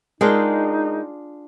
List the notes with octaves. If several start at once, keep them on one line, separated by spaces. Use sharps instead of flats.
G#3 D4 D#4 F4 G#4 A#4 G5